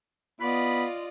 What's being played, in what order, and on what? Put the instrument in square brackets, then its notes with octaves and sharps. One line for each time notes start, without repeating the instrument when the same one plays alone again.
[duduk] B3 [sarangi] F4 [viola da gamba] D5 D#5 [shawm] B5